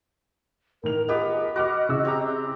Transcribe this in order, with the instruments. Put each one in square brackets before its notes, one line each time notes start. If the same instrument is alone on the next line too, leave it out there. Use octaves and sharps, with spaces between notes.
[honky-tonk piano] A2 D#3 F7 [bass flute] A#4
[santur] B3 G4 [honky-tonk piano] F4 G#4 A#4 [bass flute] D#5
[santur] F#4 [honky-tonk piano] B5 D6 F6
[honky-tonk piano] C#3 E4 E6
[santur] C4 G4 A#5